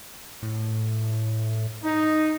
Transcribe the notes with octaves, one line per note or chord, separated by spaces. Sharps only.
A2
D#4